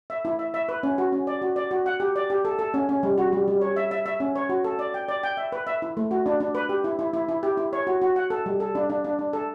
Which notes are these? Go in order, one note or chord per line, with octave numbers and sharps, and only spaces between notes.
E5
E4
E5
E5
B4
C#4
F#4
C#4
D5
F#4
D5
F#4
F#5
G4
D5
G4
A4
A4
C#4
C#4
G3
F#4
G3
G3
C#5
E5
E5
E5
C#4
C#5
F#4
A4
D5
G5
D5
G5
E5
B4
E5
E4
A3
F#4
D4
D4
B4
G4
E4
E4
E4
E4
G4
E4
C#5
F#4
F#4
F#5
A4
G3
A4
D4
D4
D4
D4
A4